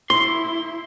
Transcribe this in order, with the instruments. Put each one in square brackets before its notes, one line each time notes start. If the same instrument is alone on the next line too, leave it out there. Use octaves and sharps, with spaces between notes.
[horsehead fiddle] E4 [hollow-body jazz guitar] C6